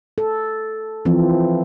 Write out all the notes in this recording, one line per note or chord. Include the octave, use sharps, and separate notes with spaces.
A4
E3 F3 C4